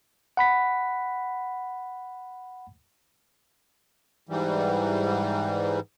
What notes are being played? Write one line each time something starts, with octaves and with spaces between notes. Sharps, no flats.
F#5 B5 B6
G#2 E3 G3